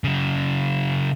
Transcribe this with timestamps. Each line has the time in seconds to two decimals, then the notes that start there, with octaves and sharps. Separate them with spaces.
0.04 C#3 F#3